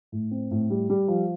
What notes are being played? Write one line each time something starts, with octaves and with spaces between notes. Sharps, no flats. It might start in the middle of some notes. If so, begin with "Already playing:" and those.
A2
C4
A2
G3
G3
F3